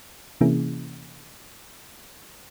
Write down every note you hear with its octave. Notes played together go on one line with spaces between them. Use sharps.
C3 E3 A#3 C#4 E4 G#4